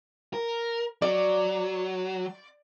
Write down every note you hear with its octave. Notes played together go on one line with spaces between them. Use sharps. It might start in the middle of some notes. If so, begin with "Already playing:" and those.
A#4
F#3 D5